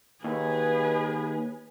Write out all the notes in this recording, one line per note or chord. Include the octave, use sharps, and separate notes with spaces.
D#2 G#4 B4